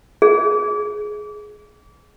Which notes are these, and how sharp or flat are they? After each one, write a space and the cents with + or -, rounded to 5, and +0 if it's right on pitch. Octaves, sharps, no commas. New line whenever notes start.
G#4 +15